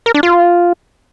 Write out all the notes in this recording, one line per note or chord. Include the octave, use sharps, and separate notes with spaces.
A#4
D4
F4